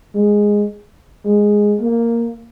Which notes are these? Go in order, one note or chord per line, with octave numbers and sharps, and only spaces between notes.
G#3
G#3
A#3